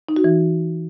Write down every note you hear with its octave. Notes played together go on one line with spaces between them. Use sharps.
D#4
F#4
E3